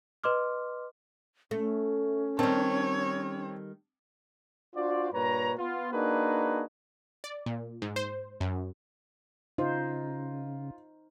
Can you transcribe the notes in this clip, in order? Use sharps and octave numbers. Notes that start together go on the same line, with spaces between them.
B4 D#5 C6 D6 F6
A3 C#4
D#3 G3 C4 C#5 A5
D4 F4 F#4 C5 D5
G2 A#2 B4 C#5 A#5
B3 F4
A#3 D4 D#4 F#4 G#4 B4
D5
A#2
G#2
C5
F#2
C#3 D#4 F4 C5